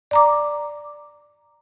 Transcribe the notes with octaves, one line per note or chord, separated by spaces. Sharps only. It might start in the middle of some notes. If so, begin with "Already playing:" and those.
D5 A#5 D6